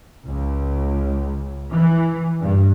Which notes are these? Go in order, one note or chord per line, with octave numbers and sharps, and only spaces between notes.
C#2
E3
G2